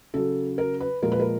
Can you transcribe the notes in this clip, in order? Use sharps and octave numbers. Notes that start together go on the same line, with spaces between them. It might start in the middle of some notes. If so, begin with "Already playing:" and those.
C#3 F#3 A4
A#4
B4
A#2 F3 G#3 A#4
B4
A#4